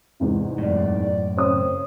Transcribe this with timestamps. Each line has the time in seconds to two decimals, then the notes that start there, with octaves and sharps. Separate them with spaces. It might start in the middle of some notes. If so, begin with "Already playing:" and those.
0.20 E2 G#2 C3
0.58 F#2 A2 D5
1.37 C#3 A#3 C4 C5 C#5 D#6